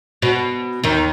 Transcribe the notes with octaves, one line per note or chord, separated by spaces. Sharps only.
B2
D#2 D#3